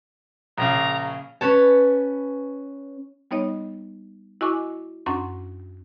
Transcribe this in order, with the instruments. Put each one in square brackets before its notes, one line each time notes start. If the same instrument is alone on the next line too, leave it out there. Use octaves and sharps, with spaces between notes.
[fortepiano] A#1 C#3 [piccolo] A#5
[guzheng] C#4 B4 C#5 A5
[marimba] G3 B3 D#4 C#5 D#5
E4 F#4 D#5 G#5 C#6 D6
F#2 C#4 D4 F#5 C6 C#6